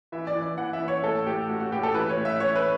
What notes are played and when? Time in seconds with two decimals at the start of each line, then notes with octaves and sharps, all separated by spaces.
0.12 E3 E5
0.27 D5
0.35 E3
0.42 D5
0.58 E3 F#5
0.73 E5
0.80 E3
0.88 C#5
1.03 A2 A4
1.26 A2 G4
1.49 A2 F#4
1.60 F#4
1.72 A2 G4
1.83 A4
1.94 E3 B4
2.09 C#5
2.17 A2
2.25 E5
2.40 E3 C#5
2.56 B4